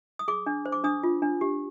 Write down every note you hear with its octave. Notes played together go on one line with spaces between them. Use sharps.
D#6
G#4 D6
D4
C5
D6
D4 D#6
F4
D4
G4